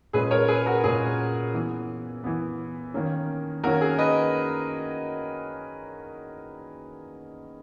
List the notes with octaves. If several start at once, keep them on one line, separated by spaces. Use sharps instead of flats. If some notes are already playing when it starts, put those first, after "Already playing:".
A#2 G#3 C#4 G#4 B4
A#4 C#5
G#4 B4
F#4 A#4
A#2 G#3 C#4 G#4
E3 B3
E3 B3
D#3 A#3 C#4
D#3 A#3 C#4 F#4 A#4
G#4
B4 D#5